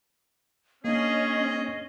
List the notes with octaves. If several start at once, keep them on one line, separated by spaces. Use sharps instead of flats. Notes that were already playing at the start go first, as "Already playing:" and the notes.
A#3 C#4 D4 G#4 D#5